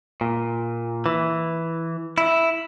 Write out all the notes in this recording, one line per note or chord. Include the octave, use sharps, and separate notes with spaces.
A#2
E3
E4